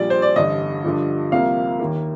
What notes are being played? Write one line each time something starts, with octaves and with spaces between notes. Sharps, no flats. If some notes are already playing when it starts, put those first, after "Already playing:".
Already playing: A#1 A#2 G3 D5
C5
D5
A1 G2 D3 D#5
G2 D3 F3
C2 C3 F3 A#3 F5
D#2 D#3 A#3